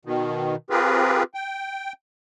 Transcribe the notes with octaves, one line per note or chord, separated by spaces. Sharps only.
B2 D#3
C4 F4 G4 G#4 A#4 B4
G5